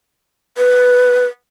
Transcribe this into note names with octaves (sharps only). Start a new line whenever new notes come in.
B4